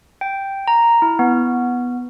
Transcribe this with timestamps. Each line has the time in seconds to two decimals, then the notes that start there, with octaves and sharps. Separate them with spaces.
0.21 G5
0.68 A#5
1.02 E4
1.19 B3